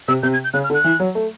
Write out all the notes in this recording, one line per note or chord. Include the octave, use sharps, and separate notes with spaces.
C3 E6
C3 G6
G#6
G6
C#3 F#6
F6
D3
F#6
E3
F#3
A3